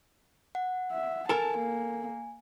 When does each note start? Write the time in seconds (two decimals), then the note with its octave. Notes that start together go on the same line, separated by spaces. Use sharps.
0.55 F#5
0.92 E5
1.29 A4 A#4 G#5 A5
1.59 A#3